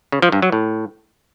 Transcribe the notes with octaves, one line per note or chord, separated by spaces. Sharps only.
C#3
F3
G2
F#3
A2